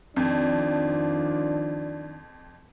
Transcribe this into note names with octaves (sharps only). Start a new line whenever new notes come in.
F2 D#3 F3 D4